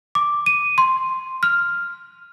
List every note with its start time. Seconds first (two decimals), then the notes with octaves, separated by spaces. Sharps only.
0.15 D6
0.46 D#7
0.78 C6
1.43 F6